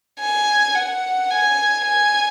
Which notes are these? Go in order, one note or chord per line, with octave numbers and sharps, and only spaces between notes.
G#5
F#5
G#5
G#5